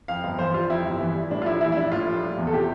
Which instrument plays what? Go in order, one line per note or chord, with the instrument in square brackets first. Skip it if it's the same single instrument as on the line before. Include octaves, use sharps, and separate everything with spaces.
[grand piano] F2 F5
G1
E3 C5
G3 F4
F2 E4
G1
E3
G3
A2 D4
F4
A#1 E4
E3 E4
E4
G3 D4
A2 F4
A#1
G3
E2
A4
C3 G4